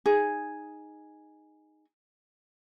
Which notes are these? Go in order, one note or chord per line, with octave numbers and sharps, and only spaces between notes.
D#4 G#4